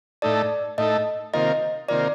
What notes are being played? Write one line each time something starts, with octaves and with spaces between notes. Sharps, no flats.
A2 A3 D#4 A4 D5
A2 A3 D#4 A4 D#5
C3 D#3 A#3 F4 A#4 D#5
C3 D#3 A#3 F4 A#4 D5